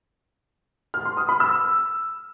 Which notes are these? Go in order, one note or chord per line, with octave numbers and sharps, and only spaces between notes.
F6
C6
D#6
B5
E6